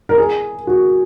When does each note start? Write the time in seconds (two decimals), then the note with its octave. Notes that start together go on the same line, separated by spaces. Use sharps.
0.09 A#4
0.18 G#4
0.67 F#4